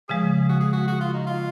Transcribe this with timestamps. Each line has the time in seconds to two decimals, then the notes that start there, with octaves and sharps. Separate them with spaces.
0.08 C#3 F3 G#3 G#4
0.49 F#4
0.60 G#4
0.73 F#4
0.88 F#4
1.00 F4
1.13 D#4
1.27 F4